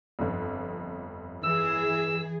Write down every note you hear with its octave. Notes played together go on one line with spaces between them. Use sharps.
G1 F2
E3 G#4 E6